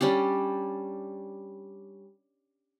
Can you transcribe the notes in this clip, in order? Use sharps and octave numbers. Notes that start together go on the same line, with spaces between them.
G3 C#4 D4 G4